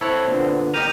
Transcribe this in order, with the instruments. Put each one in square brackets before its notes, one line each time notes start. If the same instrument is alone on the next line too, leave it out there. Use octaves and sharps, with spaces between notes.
[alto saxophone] C4 [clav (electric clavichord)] E4 [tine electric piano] A4 C#5 F#6
[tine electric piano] A#2 D3 B3
[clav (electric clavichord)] D#4 G4 A#4 [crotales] G6 D#7 F7